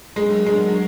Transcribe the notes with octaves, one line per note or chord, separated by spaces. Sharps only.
F#3 G#3 D4 F#4 A#4
G#3